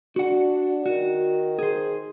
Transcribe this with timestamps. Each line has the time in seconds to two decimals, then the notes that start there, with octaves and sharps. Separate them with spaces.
0.16 D4 F#4 F#5
0.86 D#3 F#4
1.59 G#4 C5